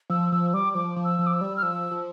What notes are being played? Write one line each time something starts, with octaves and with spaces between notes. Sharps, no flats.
F3 E6
F3 E6
G3 D6
F3 D6
F3
E6
F3
D6
E6
G3
F6
F3 E6
F3